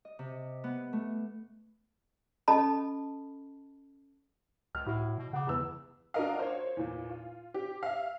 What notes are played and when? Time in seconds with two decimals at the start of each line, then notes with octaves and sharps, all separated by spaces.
0.05 D#5
0.19 C3
0.64 B3
0.93 A3
2.48 C#4 A4 D#5 A5 B5
4.75 C#2 F6
4.86 A2 E4 F#4
5.18 B2
5.33 C#3 F#5 D6
5.47 E2 B4 E6
6.14 D4 F4 F#4 A#4 D#5 F5
6.39 C5 C#5
6.77 E2 A#2
7.10 F4
7.54 G4
7.83 E5 F5